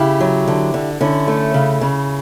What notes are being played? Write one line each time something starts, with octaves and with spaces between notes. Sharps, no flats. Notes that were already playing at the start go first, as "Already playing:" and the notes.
Already playing: C#3 E4 G4
F#3
D3
D3
D3 C#4 E4
A3
C#3
C#3